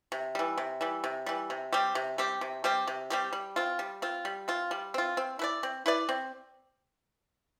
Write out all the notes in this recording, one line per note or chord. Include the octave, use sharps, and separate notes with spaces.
C3
E3 G3
C3
E3 G3
C3
E3 G3
C3
G3 C4 G4
C3
G3 C4 G4
C3
G3 C4 G4
C3
G3 C4 G4
G3
C4 F4
G3
C4 F4
G3
C4 F4
G3
C4 F4
C4
E4 B4 D5
C4
E4 B4 D5
C4